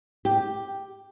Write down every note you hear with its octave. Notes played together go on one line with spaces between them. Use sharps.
G4